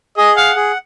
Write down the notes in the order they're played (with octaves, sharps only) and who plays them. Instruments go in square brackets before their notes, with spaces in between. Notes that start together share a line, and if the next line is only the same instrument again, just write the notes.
[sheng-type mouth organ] G#4 [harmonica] D#5
[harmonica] F5 [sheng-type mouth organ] F#5
[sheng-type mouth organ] G#4